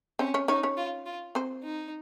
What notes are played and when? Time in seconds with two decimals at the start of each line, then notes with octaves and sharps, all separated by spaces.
0.19 C4 C#4 C5
0.34 C#4 C#5
0.48 C#4 D#4 C#5
0.63 C#4 C#5
0.78 F4
1.06 F4
1.35 C4 C5
1.64 D#4